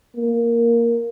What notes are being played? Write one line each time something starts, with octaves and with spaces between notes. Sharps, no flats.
A#3